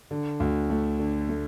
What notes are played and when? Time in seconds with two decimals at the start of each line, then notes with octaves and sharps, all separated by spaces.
0.11 D3
0.40 D2
0.70 A3
0.99 D3
1.29 A3